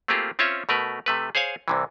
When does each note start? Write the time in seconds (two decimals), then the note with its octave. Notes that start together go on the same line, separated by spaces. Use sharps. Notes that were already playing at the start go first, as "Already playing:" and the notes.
0.08 A3 A#3 C4 F4 G4 G#4
0.39 C4 C#4 F4 C#5 E5
0.69 B2 A3 A#4 B4
1.06 C3 A3 B4
1.35 G#4 C5 C#5 F5 G#5
1.68 C2 C3 E3